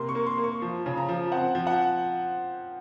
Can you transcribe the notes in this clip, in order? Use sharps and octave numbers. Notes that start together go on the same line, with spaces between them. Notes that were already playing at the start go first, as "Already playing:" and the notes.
Already playing: C3 A#3 C6
C#6
A#3
C6
A#3
C#6
F3
C#3
A#5
F3
C4 F#5
F3
F#5